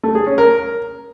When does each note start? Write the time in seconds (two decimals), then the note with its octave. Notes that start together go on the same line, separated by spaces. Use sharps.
0.03 A3
0.15 G#4
0.26 C#4
0.38 A#4